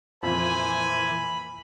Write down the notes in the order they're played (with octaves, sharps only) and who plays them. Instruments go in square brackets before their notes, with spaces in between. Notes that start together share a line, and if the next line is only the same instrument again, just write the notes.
[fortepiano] F2 [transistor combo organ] A#2 E3 [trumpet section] C5 G#5 [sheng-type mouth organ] B5